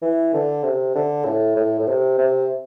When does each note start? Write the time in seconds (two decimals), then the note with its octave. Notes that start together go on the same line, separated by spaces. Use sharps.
0.02 E3
0.33 D3
0.63 C3
0.95 D3
1.25 A2
1.56 A2
1.79 A2
1.87 C3
2.18 C3